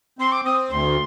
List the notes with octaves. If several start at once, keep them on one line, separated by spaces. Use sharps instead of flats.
C4 C6
D6
C4 D#6
D2 C6